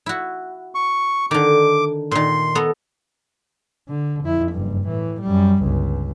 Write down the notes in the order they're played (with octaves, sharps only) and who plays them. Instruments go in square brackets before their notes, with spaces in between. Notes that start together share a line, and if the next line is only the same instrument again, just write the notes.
[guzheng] E4 F#4
[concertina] C#6
[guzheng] D3 D#3 [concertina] D6
[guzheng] A#2 D#3 [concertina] C6
[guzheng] B3 A4 A#5
[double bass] D3
F2 E4
F#1 G2
A2 E3
F#2 G3
G1 C#2